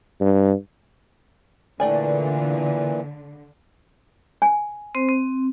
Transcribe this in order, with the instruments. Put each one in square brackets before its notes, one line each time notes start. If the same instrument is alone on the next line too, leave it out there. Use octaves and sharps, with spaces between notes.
[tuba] G2
[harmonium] A#2 E3 [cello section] D3 [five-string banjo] A3 D5 G#5
[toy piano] G#5
[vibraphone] C4 C5
C4